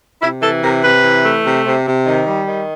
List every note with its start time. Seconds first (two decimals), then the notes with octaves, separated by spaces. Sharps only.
0.21 C3 E4
0.42 E3 A4
0.62 C3 A#4
0.83 C3 B4
1.04 E3
1.24 A3
1.44 C3
1.65 C3
1.86 C3
2.06 D#3
2.26 G3
2.47 D#3